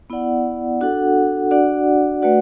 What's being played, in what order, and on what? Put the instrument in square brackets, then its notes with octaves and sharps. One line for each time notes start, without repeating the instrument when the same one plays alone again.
[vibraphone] B3 E4 D5 F#5
D4 F#4 A4 F#5
D4 F#4 D5 F#5
A3 F#4 B4 D5 F#5